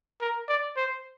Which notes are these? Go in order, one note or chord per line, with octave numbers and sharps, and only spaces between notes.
A#4
D5
C5